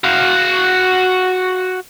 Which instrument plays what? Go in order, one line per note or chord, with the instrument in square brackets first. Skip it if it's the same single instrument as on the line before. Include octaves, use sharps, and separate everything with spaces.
[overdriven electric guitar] F#4 F5